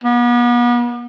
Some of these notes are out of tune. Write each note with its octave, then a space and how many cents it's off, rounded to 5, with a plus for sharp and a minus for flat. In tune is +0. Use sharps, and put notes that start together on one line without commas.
B3 -40